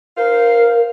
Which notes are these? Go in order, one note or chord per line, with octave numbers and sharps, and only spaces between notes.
D#4 A#4 C5 F5